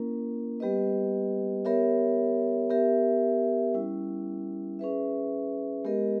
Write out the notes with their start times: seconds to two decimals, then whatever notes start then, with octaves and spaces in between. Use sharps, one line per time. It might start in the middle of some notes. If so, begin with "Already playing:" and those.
Already playing: A#3 C#4 E4 A#4
0.60 G3 B3 G4 B4 D#5
1.65 B3 G4 A#4 C#5 E5
2.70 B3 G4 A#4 E5
3.74 G3 C#4 E4
4.79 C#4 G#4 B4 E5
5.84 G#3 B3 G4 A#4 D#5